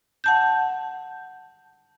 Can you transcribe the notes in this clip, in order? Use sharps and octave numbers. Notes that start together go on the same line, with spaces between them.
F#5 A5 G6